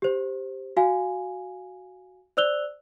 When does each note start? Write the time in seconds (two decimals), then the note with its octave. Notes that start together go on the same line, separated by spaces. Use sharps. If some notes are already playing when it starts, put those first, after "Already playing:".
0.02 G4 C5
0.77 F#4 F5 G#5
2.37 C5 D5 E6 F#6 F7 G7